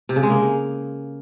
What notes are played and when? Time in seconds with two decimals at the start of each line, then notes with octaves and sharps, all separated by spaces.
0.09 C3
0.16 C#3
0.23 G#3
0.30 A#3